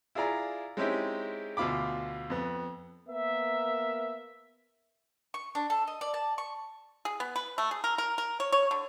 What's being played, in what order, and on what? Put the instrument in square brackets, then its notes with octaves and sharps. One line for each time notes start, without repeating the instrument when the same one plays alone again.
[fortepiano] E4 F4 G#4 D5 A#5
G#3 C4 C#4 D#4 E4 G4
D2 B2 F4 B5 D6
F2 B3
[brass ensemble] A#3 B3 A#4 E5
[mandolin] C#6
D4
A4
D#5
D5
A5
C#6
[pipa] G#4
B3
B4
A3
G#4
A#4
A#4
A#4
C#5
C#5
D3